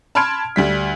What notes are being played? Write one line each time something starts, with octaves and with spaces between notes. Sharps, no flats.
A5 B5 C6 F6 G#6 D7
D2 G3 B6